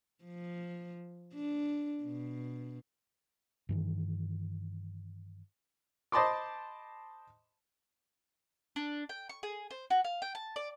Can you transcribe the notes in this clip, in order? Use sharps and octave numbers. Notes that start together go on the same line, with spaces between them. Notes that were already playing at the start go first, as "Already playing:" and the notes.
F3
D4
B2
G2 D#3 E3
C5 D#5 A5 B5 C6 D6
D4
G5
C#6
G#4
C5
F#4
F5
G5
A5
D5